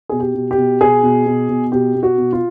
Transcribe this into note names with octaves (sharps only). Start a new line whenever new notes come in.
B2 G#4
G4
B2
G4
B2
B2 G#4
B2
B2
B2
B2 G4
B2
F#4
B2
F4